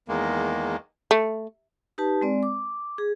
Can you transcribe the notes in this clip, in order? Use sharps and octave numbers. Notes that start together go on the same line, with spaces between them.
E2 D#3 G#3 A#3
A3
D#4 G4 B4 A5
G#3 C4 D5
D6
G#4